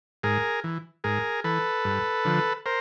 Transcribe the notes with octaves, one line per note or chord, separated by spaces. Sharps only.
G#2 G#4 A#4
E3
G#2 G#4 A#4
E3 A4 B4
G2
D3 F3
A#4 C5